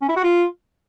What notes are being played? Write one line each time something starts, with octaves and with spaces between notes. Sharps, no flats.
C#4
E4
F#4
F4